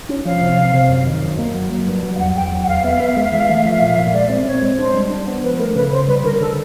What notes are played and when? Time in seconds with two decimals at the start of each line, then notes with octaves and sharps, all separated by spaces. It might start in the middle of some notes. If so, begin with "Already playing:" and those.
0.09 C#4
0.25 F3 F5
0.41 C3
0.58 C3
0.74 C3
0.90 F#2
1.06 D#3
1.22 F#2
1.38 A#3
1.54 F#3
1.71 F#3
1.87 G2
2.03 F#3
2.15 F5
2.19 E2 F#5
2.36 E2 G5
2.52 F#3
2.64 F#5
2.68 E2 F5
2.84 B3 E5
2.92 F5
3.00 B3 E5
3.08 F5
3.16 G#3 E5
3.23 F5
3.31 E3 E5
3.40 F5
3.48 A3 E5
3.55 F5
3.63 F3 E5
3.71 F5
3.79 A#2 E5
3.87 F5
3.95 E5
3.98 A#2
4.13 G#3 D5
4.29 C4
4.45 C4 C#5
4.62 G#3
4.78 D4 C5
4.95 G3
5.10 D4
5.27 B3
5.42 F3 B4
5.59 A3 A#4
5.75 C#3 B4
5.92 C#3 C5
6.07 G3 B4
6.24 D3 A#4
6.40 D3 A4